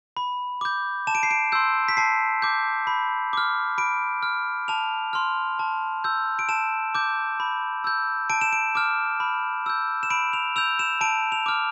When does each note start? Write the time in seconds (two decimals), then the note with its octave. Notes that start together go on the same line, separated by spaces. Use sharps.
0.17 B5
0.61 D6 G6
1.07 A5 E7
1.15 D7
1.23 C7
1.31 D7
1.52 C6 E6 G6
1.88 B6
1.97 A5 C7
2.42 D6 G6
2.87 B5
3.33 D6 F6
3.78 B5 D7
4.23 F6
4.68 A5 F7
5.13 C6 F6
5.59 A5
6.04 E6 G6
6.39 D7
6.49 A5 E7
6.95 D6 G6
7.40 B5
7.84 E6 G6
8.30 A5 D7
8.41 E7
8.53 D7
8.75 D6 F6
9.20 B5
9.66 E6 G6
10.03 E7
10.10 B5 D7
10.33 F7
10.56 E6 G6 F7
10.79 E7
11.01 A5 D7
11.32 F7
11.46 D6 F6